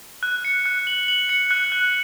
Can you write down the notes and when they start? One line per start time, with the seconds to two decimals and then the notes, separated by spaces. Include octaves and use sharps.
0.23 F#6
0.45 C#7
0.66 F#6
0.87 F#7
1.08 F#7
1.29 C#7
1.51 F#6
1.72 F#6